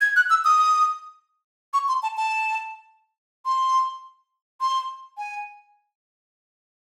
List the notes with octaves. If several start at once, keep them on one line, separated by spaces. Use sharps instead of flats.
G#6
F#6
E6
D#6
C#6
C6
A5
A5
C6
C6
G#5